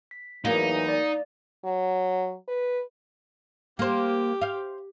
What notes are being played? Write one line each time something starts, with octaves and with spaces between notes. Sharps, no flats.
B6
E2 E3 F#3 A#3 D#4
D5
F#3
B4
A#3 G4 C5
C5 F5